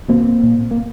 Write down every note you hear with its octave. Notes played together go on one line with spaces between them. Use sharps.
B2 A#3 C4
A#2
A#3